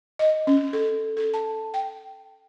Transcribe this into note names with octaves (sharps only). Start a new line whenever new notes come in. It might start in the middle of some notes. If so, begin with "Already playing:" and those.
D#5
C#4
A4
A4
A5
G5